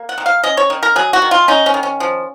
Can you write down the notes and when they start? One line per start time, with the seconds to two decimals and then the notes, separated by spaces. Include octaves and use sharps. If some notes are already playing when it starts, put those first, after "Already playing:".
Already playing: A#3
0.09 F#5
0.18 D#3
0.26 F5
0.43 C#4 D#5
0.57 C#5
0.70 D#3
0.83 A#4
0.96 F#3 G#4
1.13 F#4
1.22 D#3
1.31 F4
1.48 C#4 D#4
1.66 C#4
1.74 D#3
1.83 C#4
2.00 F3